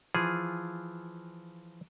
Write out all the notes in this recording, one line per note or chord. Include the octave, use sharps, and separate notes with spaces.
E3 F3 F4 G#4